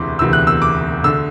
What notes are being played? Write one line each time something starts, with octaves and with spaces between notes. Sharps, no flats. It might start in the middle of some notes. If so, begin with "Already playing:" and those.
Already playing: E1 D2 C3 E3 C6 D6
E1 D2 C3 E3 E6
F#6
E6
D6
D2 D3 E6